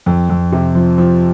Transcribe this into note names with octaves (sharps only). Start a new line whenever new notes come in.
F2
F2
C3
F3
F3